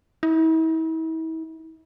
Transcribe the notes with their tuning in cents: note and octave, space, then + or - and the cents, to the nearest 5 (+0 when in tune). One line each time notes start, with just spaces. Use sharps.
E4 -40